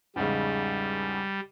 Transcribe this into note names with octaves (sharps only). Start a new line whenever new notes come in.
E2 G#2 C#3 G3